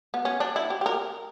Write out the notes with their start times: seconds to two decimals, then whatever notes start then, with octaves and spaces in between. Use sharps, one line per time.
0.14 B3
0.25 C#4
0.40 D4
0.56 E4
0.70 G4
0.81 G4
0.86 A#4